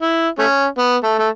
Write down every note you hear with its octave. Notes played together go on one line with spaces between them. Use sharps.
E4
A3 C#4
B3
A3
A3